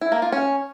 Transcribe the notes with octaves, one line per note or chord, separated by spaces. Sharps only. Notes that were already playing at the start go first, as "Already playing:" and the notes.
E4
A#3
F4
C#4